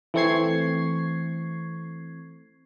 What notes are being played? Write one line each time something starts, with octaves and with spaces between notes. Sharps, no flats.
E3 A3 C4 C#6 G#6 C7